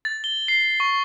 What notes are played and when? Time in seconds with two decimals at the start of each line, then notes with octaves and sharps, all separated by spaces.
0.05 A6
0.24 G7
0.48 C7
0.80 C#6